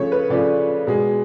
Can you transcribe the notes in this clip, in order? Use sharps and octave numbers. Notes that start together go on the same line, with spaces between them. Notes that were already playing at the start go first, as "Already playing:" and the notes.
Already playing: C#3 F3 A3 C#5
B4
C#3 F3 A3 D5
B2 G#3